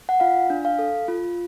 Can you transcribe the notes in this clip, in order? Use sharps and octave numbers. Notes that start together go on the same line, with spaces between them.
F#5
F4 F5
D4
F5
A4
F4